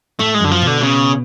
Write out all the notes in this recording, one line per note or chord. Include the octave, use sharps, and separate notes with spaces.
A2 A3
G#3
F#2 D3
F3
B2
D3
C#3